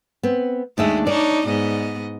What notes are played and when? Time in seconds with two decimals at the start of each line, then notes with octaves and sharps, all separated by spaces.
0.23 B3 C4
0.78 D#2 G#3 A3 D4 E5
1.07 D4 D#4 C#5 D5
1.45 G#2 B3 D#5